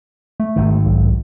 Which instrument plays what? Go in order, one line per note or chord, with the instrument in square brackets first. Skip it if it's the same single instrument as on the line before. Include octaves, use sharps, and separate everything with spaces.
[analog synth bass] A3
[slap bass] G#1 D#3
[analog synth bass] B1